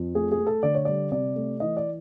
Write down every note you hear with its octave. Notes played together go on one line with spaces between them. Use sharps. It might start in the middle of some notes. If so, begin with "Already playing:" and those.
Already playing: F2
A3 G#4
G#4
A3
A4
D3 D5
C#5
G3 D5
C3 D5
A3
E3 D#5
D5